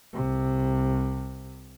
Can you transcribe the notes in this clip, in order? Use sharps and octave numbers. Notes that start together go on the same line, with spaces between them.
C2 C3